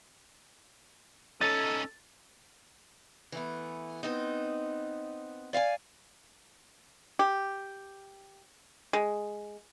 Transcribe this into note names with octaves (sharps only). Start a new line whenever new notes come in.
C#4 D#4 A4 A6
E3 A3 B3
B3 C4 D#4
D5 F5 F#5 G#5
G4
G#3